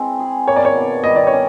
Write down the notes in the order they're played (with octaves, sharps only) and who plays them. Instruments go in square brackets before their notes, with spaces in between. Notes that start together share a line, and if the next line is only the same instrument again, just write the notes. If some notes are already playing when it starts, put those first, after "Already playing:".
Already playing: [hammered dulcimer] G#3 C4 E4
G#4
[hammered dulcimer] A#3 [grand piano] C#5
[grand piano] D5
C#5
[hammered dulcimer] B2
[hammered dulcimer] G3 [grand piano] D#5
[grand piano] D5
C#5
[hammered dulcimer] C#4